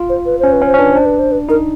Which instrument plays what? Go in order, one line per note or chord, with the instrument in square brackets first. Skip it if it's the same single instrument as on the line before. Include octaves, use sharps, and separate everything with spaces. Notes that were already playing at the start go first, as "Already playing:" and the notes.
Already playing: [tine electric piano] F4
[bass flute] C5
B4
[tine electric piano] C#4 [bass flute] C5
[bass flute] B4
[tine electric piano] C#4
[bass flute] C5
[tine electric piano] C#4
[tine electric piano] D4 [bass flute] B4
[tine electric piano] D4 [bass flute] C5
[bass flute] B4
C5
B4
[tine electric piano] D#4 [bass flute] A#4